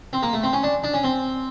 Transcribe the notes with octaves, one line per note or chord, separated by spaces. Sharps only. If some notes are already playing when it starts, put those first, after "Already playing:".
C4
A#3
A3
C4
C#4
D4
D4
C#4
C4